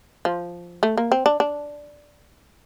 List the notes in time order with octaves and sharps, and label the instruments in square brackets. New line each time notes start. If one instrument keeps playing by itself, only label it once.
[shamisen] F3
A3
A#3
C4
D4
D4